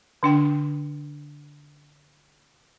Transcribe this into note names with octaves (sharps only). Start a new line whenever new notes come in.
D3 D4 G5